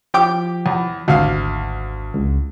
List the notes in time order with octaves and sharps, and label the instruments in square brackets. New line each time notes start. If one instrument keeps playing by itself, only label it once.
[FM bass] F3 [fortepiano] G4 G5 D6
[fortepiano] E2
[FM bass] G#1 [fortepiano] D2 F5
[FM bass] C#2